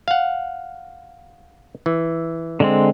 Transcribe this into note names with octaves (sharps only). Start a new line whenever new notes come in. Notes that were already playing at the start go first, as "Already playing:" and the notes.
F5 F#5
E3
D3 G#3 C4